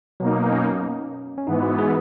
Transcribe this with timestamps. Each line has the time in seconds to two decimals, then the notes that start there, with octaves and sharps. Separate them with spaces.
0.20 B2 F#3 A#3 D#4
0.51 C#4
1.38 C#4
1.47 G#2 E3 B3 D#4
1.63 F#4
1.78 G#4